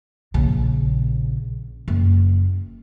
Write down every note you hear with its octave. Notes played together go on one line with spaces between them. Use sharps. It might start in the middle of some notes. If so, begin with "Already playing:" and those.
A#1 C#3
F#1